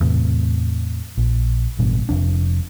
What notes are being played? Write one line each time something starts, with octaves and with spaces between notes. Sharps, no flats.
E2 A2 C3
A#1
A1 G2 B2
F1 F2 D4